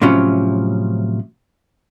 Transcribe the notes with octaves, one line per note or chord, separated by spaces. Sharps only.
A2 C3 F3 F#3 C#4